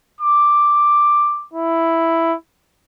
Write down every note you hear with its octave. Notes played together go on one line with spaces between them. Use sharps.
D6
E4